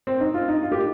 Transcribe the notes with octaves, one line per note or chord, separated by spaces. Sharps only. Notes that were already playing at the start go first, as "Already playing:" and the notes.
C4
D#4
F4
D#4
F4
G4